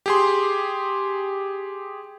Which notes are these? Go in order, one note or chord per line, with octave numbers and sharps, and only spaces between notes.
G4 G#4 C6